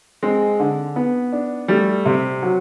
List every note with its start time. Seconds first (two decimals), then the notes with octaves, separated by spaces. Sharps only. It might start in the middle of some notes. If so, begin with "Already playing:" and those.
0.23 G#3 C4
0.60 D3
0.96 B3
1.32 D4
1.68 G3 A3
2.06 C3
2.42 F#3